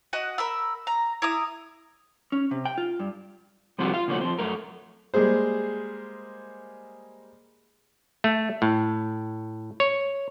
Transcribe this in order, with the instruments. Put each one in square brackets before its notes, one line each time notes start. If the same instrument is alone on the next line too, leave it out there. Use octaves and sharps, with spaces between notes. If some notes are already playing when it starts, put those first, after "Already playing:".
[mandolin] F#4 D#5 F#5
A#4 B5 E6
A#5
E4 A#5 D#6
[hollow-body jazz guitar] C#4
C3
G5
F4
G2
[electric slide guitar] C3 F3 G3 C4 F4 F#4
F4 F5
A#2 C#3 F3 A3 C#4 F#4
F3 C4
F#2 A3 A#4
[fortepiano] G3 G#3 A#3 G#4 C5
[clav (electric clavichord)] A3
A2
C#5